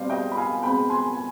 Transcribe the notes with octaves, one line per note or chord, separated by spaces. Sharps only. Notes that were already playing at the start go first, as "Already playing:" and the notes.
Already playing: B2 G3 C4 D5 F5
D#5 G5
B5
F5 G#5
B2 G#3 C4 G5 B5
G#5 C6
G#5